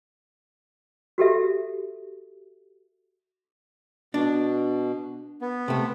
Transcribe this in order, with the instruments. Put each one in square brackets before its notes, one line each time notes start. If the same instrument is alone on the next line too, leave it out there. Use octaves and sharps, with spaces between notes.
[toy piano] F#4 G4 A4 E5
[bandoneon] B2 [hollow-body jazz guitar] D4
[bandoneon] B3
[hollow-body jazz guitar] C3 A3